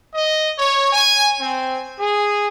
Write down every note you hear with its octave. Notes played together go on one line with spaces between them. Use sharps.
D#5
C#5
G#5
C4
G#4